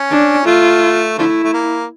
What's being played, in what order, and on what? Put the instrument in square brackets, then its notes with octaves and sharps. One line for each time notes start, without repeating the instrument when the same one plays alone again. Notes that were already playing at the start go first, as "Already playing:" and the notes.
Already playing: [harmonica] C#4
[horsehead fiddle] D4
[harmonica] A3 [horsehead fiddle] F4
[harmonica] D3 F3 A3 [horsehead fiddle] E4
[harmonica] A3
A#3